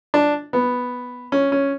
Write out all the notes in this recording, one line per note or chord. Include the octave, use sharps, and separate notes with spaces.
D4
B3
C#4
C#4